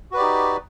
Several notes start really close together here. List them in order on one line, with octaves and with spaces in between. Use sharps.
F#4 B4 D5 G4 D#4